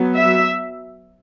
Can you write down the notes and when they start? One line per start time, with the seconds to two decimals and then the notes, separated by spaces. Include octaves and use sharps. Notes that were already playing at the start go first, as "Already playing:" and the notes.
Already playing: F#3 B3
0.16 E5